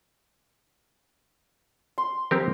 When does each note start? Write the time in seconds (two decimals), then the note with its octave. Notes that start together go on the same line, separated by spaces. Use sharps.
1.98 C6
2.31 C4 G4 A#4